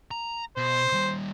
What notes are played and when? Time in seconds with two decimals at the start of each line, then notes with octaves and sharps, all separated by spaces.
0.11 A#5
0.57 B2 C5
0.92 D#3 G3